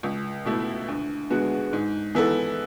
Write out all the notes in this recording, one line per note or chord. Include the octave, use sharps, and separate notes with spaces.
C#2
B2 A3 E4
D2
D3 G#3 B3 F#4
G#2
E3 B3 E4 A4